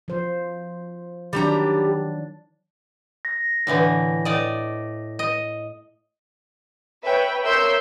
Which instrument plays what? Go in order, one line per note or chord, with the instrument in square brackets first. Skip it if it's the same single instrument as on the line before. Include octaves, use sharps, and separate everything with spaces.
[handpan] F3 C5
[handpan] D#3 F#3 D4 [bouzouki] G3 G4 A#5
[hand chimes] A#6
[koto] A2 D3 E3
A2 D5 D#5
D#5
[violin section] B4 C#5 E5 G5
A#4 C#5 E5 C6 E6 G6